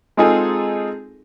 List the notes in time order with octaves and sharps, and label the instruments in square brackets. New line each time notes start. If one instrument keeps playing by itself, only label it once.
[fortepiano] G#3 C4 D#4 F4 G#4 A4